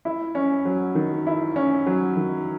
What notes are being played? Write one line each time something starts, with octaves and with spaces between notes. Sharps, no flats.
E4
C#4
F#3
D#3
E4
C#4
F#3
D#3